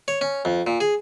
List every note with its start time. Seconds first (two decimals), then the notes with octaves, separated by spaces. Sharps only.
0.08 C#5
0.21 C#4
0.45 F2
0.67 A#2
0.81 G#4